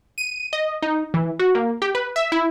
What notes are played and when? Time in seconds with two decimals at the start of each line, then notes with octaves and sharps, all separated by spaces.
0.18 D#7
0.53 D#5
0.82 D#4
1.14 E3
1.39 F#4
1.55 A#3
1.82 G4
1.95 B4
2.16 E5
2.32 E4